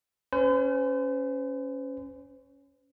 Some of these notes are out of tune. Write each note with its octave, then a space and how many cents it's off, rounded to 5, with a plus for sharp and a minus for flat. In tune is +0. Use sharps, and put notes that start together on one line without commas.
C#4 +0 C5 -45